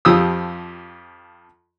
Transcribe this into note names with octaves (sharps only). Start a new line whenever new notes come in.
F2 F3 G4 D#6 E6